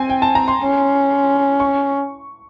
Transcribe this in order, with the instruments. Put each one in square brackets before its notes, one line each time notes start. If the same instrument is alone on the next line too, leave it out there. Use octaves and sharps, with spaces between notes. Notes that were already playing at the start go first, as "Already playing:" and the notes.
Already playing: [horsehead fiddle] C4 [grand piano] G#5
[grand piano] G5
A5
A#5
C6
[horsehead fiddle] C#4
[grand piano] C#6